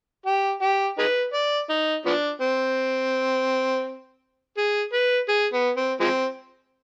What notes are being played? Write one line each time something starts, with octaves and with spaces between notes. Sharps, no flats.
G4
G4
D#4 G#4 B4
D5
D#4
F3 B3 D4
C4
G#4
B4
G#4
B3
C4
F3 G#3 C4